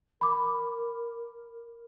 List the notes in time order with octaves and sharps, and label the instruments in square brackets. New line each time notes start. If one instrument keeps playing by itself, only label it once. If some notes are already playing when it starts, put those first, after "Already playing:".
[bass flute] A#4 [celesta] B5 D6